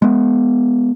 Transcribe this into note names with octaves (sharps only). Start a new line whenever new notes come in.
G#3 B3